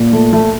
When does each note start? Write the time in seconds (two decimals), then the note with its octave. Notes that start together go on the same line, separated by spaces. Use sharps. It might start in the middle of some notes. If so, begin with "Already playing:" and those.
Already playing: A#2
0.13 A3
0.33 A3